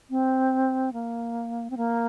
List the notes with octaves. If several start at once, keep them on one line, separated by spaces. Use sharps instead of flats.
C4
A#3
C4
A#3